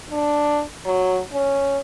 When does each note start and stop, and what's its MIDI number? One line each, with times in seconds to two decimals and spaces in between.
0.10 0.61 62
0.85 1.18 54
1.33 1.78 61